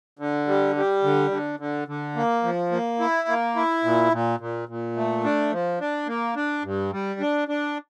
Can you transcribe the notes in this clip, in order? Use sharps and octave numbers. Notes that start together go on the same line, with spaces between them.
D3
G3
G3
D3
D3
D3
D3
A#3
F3
A#3
E4
A#3
E4
A#2
A#2
A#2
A#2
A3
D4
F3
D4
A#3
D4
G2
G3
D4
D4